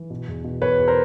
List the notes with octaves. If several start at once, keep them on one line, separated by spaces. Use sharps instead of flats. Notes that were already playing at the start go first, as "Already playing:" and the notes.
Already playing: E3
B2
E2
B2
E2 B4 C#5
E2
A#4 C5